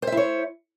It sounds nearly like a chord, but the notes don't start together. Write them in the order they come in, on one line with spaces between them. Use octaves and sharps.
C5 E5 E4 C#5